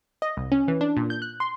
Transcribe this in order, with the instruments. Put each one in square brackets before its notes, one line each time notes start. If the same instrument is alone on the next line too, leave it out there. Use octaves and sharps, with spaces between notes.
[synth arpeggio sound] D#5
C2
C#4
E3
D4
A#2
G6
F#6
C6